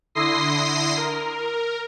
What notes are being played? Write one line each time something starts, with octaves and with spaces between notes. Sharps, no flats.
D3 E4 C6 D#6 A#6 C7
A#4